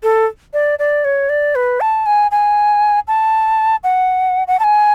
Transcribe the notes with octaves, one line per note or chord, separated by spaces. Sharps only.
A4
D5
D5
C#5
D5
B4
A5
G#5
G#5
A5
F#5
F#5
A5
G#5